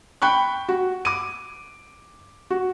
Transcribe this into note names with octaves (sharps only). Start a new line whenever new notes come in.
G5 B5 C#6 F#6
F#4
D6 D#7
F#4